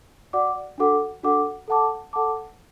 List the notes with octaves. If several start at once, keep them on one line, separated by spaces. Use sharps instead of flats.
F#4 D5 F#5 D6
D4 F#4 A4 F#5 D6
D4 F#4 A4 F#5 D6
A4 F#5 A5 D6
A4 F#5 A5 D6